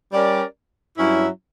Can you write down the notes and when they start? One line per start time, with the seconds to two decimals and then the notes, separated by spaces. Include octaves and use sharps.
0.13 G3 C#4 G4 A#4 D5
0.98 G2 F#3 C#4 E4